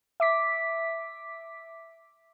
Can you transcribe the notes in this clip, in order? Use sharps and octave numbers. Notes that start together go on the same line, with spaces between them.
E5 D6 B6